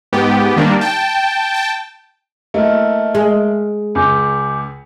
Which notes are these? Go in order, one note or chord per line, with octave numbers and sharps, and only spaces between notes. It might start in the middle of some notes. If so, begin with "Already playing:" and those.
G#2 B3 G4
D#3 G3 A#3 D4
G5 A5
G5 A5
A3 A#3 E4 D#5 E5 F6
G#3
C#2 G#5 D6 G6